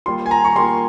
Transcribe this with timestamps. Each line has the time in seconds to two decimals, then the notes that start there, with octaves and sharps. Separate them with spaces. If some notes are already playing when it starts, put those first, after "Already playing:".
0.06 G3 A#3 F4 C6
0.26 G#5
0.31 A#5
0.44 C#6
0.56 G3 A#3 F4 C6